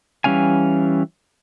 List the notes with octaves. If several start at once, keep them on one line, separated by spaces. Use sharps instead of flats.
E3 G3 C#4 F5 G#5